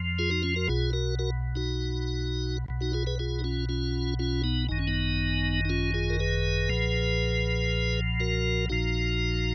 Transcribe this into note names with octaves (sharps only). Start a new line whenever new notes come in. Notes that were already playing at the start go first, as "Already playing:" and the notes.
Already playing: F2 F3
F4 G#4
D#4 F#4
C#4 F4
F#4 A#4
B1 B2 F4 G#4
F#4 A#4
F#4 A#4
D#4 F#4
B1 B2
D#4 F#4
F4 G#4
G#4 B4
F4 G#4
D#4
C#4 F4
C#4 F4
C#4 F4
B3 D#4
G#1 F#2 D#3 D#4
C#4
B3 D#4
D#4
C#4 F4
F4 G#4
A#4
G#4 B4
B1 A#2 F3
F#4 A#4
A#1 A#2 F3 D#4 F#4